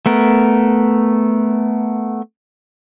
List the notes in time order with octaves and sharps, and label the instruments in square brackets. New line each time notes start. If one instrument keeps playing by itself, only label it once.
[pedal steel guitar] A3 B3 A#4